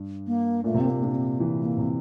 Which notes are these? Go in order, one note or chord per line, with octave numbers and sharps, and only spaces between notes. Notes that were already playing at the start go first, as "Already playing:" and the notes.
Already playing: G2
A#3
A#2 A3
C3
A#2 C4
A#3
A#2 D4
C4
E3
A3
A#3
C3